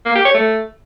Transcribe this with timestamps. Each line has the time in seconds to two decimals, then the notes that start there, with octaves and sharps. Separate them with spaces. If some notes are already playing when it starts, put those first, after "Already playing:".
0.06 A#3
0.15 G4
0.25 C#5
0.34 A3